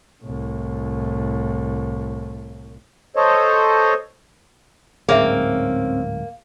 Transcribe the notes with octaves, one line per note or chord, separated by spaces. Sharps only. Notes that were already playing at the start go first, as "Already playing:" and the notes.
C2 A2
A4 C5 C#5 D#5
D1 G#2 A#3 C4 C#4 G#4 C#5 E5